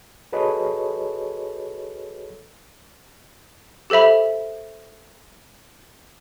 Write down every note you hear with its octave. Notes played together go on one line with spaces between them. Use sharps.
F#4 G#4 A4 B4 C#5 D#5
G4 A4 C5 E5 B5